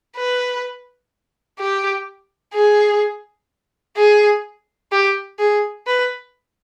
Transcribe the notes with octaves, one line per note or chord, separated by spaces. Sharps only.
B4
G4
G#4
G#4
G4
G#4
B4